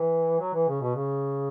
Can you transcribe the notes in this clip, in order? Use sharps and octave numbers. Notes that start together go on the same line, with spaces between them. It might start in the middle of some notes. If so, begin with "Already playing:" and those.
Already playing: E3
F#3
E3
C#3
B2
C#3